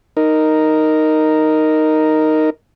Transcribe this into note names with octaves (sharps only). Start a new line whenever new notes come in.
D#4 A#4